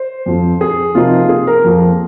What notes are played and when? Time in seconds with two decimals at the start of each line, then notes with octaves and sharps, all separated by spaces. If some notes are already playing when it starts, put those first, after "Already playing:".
Already playing: C5
0.26 F2 F3 C4
0.61 G#4
0.95 C3 F3 A#3 D#4 F4
1.29 G#4
1.47 A#4
1.64 F2 F3 A#3